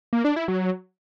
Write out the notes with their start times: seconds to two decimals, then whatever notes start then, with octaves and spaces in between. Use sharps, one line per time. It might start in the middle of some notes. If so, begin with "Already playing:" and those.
0.13 A#3
0.24 D4
0.36 E4
0.48 F#3